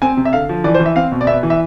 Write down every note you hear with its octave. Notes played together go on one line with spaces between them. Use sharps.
C4 G#5
C3
E5
D3 F5
F3
E3 D5
C5
E3
E5
C4 F5
B2
D5
B3 E5
E3
E5